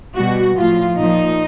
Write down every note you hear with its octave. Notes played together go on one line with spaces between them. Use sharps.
B2 G3 F#4
A2 F3 F4
A#2 F3 D#4